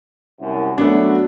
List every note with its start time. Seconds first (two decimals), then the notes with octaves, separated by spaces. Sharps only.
0.41 C2 F#2
0.78 F#3 A3 B3 D4